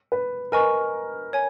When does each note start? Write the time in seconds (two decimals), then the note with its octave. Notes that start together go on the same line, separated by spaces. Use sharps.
0.12 B4
0.52 A#4 B4 D#5 G#5 C#6
1.33 C#5 G#5